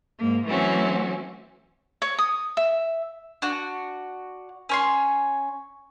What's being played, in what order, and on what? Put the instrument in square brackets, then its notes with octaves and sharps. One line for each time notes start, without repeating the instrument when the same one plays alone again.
[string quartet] G#2 A#3
E3 F#3 A3 C4 C#4 F#4
[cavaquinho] C#5
D#6
E5
[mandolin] D4 F#4
C#4 C#5 C6